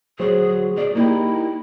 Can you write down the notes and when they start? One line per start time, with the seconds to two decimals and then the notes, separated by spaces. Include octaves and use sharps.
0.19 D2 F#3 G#4 C5
0.78 G#4 D5
0.95 A#3 D#4 E4 G4